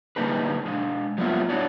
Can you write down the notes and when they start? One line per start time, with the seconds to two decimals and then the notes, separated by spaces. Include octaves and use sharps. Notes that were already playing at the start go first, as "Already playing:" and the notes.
0.16 D3 G3 A#3 D#4 G#4 B4
0.66 G#3 D4
1.18 F#3 G3 A#3 B3 F4 E5
1.49 D4 E4 F#4 C#5 D5